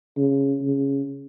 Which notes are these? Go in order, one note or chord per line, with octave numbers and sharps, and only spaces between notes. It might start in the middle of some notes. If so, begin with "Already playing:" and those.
C#3
C#3